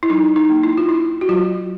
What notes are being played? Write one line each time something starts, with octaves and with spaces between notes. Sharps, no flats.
E4
F#3 D#4
D#4
A#3
E4
F4
D4 E4
F#4
F#3 F4